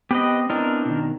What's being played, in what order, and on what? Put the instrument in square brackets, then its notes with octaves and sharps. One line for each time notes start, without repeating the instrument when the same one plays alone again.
[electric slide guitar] B3 C4 [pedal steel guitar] G4 B4 D#5
[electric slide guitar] B3 E4 D#5 [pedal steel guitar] C4 D4 A#4
[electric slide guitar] B2 D#3